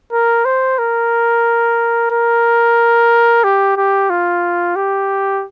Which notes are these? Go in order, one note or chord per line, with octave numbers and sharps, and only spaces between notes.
A#4
C5
A#4
A#4
G4
G4
F4
G4